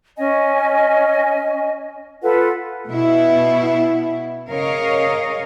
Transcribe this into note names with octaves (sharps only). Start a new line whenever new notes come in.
C#4 D#5 G#5
F4 A4 B4 F#5
B2 B3 E4
C#3 C#4 A#4 C#5 D#5 F5